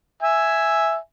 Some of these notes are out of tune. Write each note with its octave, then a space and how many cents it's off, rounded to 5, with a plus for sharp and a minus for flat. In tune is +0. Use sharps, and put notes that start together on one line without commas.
E5 +0 G#5 +0